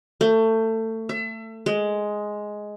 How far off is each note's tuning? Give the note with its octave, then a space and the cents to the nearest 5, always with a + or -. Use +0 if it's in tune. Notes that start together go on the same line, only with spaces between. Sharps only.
A3 +25
E5 +30
G#3 +5